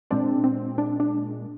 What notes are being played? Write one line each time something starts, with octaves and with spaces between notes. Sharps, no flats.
A#2 G#3 C4 D4
C4
D4
D4